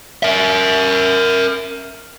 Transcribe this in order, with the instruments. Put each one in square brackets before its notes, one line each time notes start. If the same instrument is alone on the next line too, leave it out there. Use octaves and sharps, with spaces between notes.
[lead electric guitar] A#4 E5